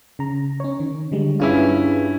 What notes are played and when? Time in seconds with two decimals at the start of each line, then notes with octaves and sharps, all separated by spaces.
0.19 C#3 A#5
0.60 C#4 C#5
0.80 D#3
1.12 D3 G3 G#3
1.40 G2 C#4 E4 F4 G#4 B4